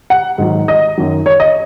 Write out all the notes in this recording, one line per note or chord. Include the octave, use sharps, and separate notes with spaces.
F#5
G#2 D#3 F#3
D#5
F#2 D#3 F#3
C#5
D#5